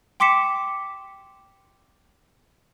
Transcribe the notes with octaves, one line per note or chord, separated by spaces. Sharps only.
G5 C6 D6 B6 C#7 E7